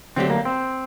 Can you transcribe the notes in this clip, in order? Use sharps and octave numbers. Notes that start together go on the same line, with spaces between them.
D3 F#3 A3 C4 D4 G4
A#3
C4